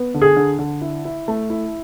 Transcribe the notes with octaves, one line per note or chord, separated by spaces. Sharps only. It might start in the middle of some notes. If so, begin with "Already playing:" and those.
Already playing: B3
D3
G#4
D3
D3
E4
E4
A3
E4